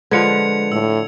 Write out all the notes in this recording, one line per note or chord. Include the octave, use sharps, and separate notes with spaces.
D3 F3 G#3 F4 B4 G#6 C#7 F7
A2 E6